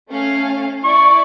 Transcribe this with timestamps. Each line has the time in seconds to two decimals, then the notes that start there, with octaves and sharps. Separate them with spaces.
0.10 A3 C#4 F5
0.84 E4 D5 C#6